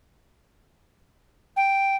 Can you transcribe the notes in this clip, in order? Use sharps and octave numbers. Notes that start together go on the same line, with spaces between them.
G5